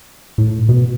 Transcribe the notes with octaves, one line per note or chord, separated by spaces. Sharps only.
A2
B2